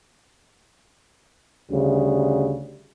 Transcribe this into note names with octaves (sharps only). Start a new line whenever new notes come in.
D2 C#3 G3